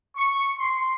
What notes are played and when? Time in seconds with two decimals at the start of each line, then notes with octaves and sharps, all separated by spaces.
0.17 C#6
0.57 C6